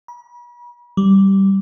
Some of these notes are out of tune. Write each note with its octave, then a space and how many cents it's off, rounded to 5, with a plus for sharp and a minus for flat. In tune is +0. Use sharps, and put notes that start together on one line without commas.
B5 -40
G3 -10